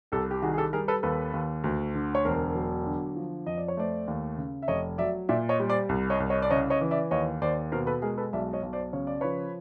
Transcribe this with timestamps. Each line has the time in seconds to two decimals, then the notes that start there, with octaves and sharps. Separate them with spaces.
0.12 C2 G4 A4
0.31 G4
0.42 D#3 F#4 G#4
0.53 G#4
0.58 G4 A4
0.73 G3 G#4 A#4
0.88 A4 B4
1.03 D#2 A4 B4
1.34 D#2
1.64 D2
1.95 D3
2.15 C#5
2.25 E1 A#4 C5
2.55 F#3
2.86 D3
3.16 F3
3.46 F2 D#5
3.58 D5
3.68 C#5
3.77 A3 C5 D5
4.07 D#2
4.38 C#3
4.62 E5
4.68 F1 C#5 D#5
4.98 F#3 D5 E5
5.29 A#2 D5 E5
5.49 C#5 D#5
5.60 G3
5.69 C5 D5
5.89 C2
6.10 C#5 D#5
6.20 C2
6.30 C#5 D#5
6.42 D5
6.50 C#3 C#5 D#5
6.70 C#5 D#5
6.81 E3
6.91 D5 E5
7.11 D#2 C#5 D#5
7.41 D#2 C5 D5
7.72 B2 A#4 C5
7.87 A4 B4
8.02 G#3 G#4 A#4
8.18 A4 B4
8.33 B1 D5 E5
8.53 C#5 D#5
8.63 B1
8.73 C5 D5
8.93 C#3 C#5
9.07 D5
9.21 F3 B4 C#5